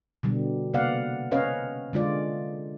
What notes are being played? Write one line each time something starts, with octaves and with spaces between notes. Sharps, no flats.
B2 D3 G3
C3 A#3 B3 D5 F5 F#5
C4 C#4 B4 C#5 D#5 F5
D3 G#3 F4 D5